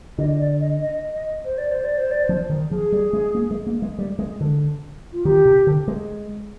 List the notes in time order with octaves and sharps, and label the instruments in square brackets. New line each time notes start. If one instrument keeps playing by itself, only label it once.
[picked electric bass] D3 [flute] D#5
[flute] D5
D#5
D#5
D#5
C5
D5
C5
D5
C5
D5
C5
[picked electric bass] F3
D#3
[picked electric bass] F3 [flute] G#4
[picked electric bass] G3
G#3
A#3
G#3
A#3
G#3
G3
G#3
D3
[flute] F4
[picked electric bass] D#3 [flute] G4
[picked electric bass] C3
D3
G#3